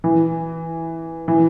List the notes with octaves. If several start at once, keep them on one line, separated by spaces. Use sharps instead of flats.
E3
E3